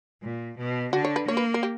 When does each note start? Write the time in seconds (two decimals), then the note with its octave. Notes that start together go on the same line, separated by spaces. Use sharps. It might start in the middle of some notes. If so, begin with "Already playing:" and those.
0.23 A#2
0.58 B2
0.93 D3 F#4
1.05 C#5
1.16 B4
1.28 A#3 C#5
1.37 B4
1.54 A#4
1.63 G4